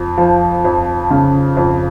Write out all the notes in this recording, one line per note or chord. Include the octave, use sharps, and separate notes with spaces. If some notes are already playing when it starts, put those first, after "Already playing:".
Already playing: F2
F3
F2
C#3
F2